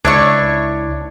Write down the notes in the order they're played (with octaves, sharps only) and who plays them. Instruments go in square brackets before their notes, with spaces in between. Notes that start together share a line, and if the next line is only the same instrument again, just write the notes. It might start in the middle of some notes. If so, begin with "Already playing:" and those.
[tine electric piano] C#2 [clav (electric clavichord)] D4 [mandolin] E4 C#5 C#6